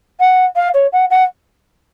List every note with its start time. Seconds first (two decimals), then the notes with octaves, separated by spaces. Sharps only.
0.20 F#5
0.56 F5
0.74 C#5
0.93 F#5
1.10 F#5